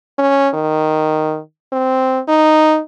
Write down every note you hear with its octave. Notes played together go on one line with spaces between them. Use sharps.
C#4
D#3
C4
D#4